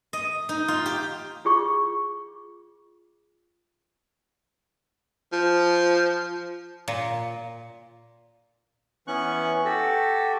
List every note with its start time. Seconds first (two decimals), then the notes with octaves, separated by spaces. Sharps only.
0.13 D#5
0.49 D#4
0.68 F4
0.86 G4
1.45 F4 G#4 C#6
5.32 F3
6.88 A#2
9.08 E3 B3 C#4 C#6 F#6
9.65 F#4 G4 A4